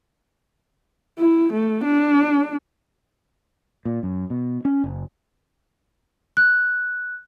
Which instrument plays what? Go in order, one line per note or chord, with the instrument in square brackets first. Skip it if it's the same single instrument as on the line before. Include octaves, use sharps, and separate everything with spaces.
[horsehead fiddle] E4
A3
D4
[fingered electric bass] A#2
F#2
B2
C#4
F#1
[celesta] F#6